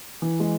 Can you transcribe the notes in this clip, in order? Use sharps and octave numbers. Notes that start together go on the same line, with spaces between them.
E3
G#3